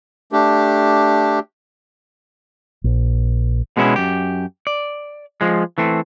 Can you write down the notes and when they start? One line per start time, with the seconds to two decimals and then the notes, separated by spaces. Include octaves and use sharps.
0.32 A3 D4 G4
2.84 A#1
3.77 B2 G#3 B3 C#4 E4
3.96 F#2 G4
4.67 D5
5.41 F3 G#3
5.78 E3 A3 C4